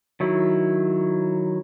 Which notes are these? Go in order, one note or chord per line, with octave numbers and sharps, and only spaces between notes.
D#3 F#3 E4